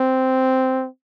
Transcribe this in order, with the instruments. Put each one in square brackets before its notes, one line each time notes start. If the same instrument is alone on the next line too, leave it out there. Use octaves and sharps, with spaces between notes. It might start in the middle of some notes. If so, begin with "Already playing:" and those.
Already playing: [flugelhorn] C4